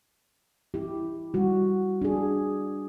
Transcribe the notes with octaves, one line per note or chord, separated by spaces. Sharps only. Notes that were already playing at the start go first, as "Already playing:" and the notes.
E4 G4
G3 F#4
D4 G#4